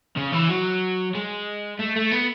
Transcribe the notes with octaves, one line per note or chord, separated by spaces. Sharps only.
C#3
E3
F#3
G#3
A3
A3
B3